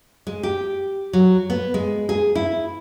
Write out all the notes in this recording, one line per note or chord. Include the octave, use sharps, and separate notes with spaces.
G#3
G4
F#3
B3
G#3
G#4
E4